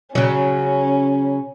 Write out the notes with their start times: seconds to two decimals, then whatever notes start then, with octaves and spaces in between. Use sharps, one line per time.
0.15 C#3 F#3 C#4